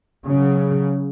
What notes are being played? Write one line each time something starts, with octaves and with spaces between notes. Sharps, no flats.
C#3 F#3